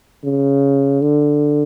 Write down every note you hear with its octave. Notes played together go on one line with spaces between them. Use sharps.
C#3
D3